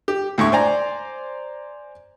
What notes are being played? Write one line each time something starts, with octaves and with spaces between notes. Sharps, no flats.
G4
D2 A2 E5 C#6
C5 D5 G#5 A#5